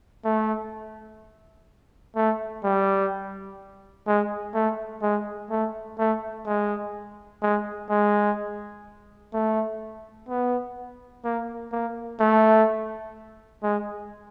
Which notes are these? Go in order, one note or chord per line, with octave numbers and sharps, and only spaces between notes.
A3
A3
G3
G#3
A3
G#3
A3
A3
G#3
G#3
G#3
A3
B3
A#3
A#3
A3
G#3